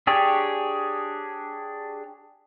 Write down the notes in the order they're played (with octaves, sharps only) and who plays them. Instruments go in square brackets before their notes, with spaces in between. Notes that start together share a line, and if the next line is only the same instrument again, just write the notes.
[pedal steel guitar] D4 G4 G#4 C#5